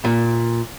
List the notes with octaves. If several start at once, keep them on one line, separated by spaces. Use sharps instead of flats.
A#2